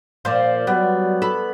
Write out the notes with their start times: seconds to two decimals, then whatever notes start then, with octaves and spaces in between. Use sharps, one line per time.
0.25 A#2 F3 C5 D5
0.67 F#3 G3 B3
1.22 A4 B5